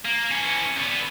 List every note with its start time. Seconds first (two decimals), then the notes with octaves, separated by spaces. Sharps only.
0.05 A#3
0.31 E3 C#4
0.77 D3 B3